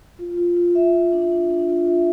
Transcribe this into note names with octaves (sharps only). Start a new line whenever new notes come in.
F4
F4
F4
E5
F4
D4
D4
D4
F4
E5